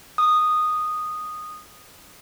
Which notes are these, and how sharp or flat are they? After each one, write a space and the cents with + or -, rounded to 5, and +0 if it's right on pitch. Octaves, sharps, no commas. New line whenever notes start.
D#6 -10